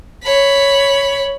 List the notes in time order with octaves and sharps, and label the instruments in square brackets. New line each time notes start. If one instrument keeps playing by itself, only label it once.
[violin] C#5 B5